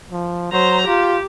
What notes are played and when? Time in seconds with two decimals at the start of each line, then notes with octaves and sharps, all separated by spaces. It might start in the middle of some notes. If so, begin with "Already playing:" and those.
0.11 F3
0.52 F#3 C5 A#5
0.87 F4 G4